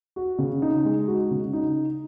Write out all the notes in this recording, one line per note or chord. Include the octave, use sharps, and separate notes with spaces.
F#4
C#3
D#4
G#3
F#4
C#3
D#4